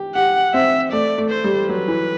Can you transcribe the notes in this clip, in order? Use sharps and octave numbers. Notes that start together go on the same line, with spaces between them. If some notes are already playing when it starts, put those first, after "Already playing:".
Already playing: G4
G4 F#5
C4 E5
A3 D5
A3
C5
G3
F#3 B4
E3